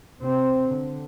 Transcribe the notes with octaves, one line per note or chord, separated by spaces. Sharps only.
C3 C4
D3